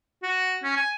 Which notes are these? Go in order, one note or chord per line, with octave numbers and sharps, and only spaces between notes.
F#4
C#4
G#5